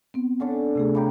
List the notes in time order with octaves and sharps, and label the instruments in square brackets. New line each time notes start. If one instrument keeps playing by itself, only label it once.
[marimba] B3 C4
[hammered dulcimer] D3 C#4 D4
[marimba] C3 A3 G#4
[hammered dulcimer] C#3 G4 [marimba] A#5 B5